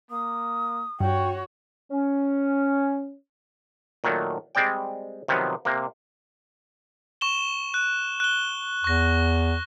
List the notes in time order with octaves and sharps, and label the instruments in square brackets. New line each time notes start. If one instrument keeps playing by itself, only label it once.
[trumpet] A#3 [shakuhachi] D#6
[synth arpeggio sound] G2 [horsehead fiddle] F#4 C#5 [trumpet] G5
[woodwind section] C#4
[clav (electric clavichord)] A#2 D#3 F#3 A3
G3 G#3 C4 D5 G5
C3 D#3 F3 F#3 B3
C3 A#3
[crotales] C#6 E7 G7
F#6
F#6 G7
[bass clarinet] E2 [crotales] C#6 A#6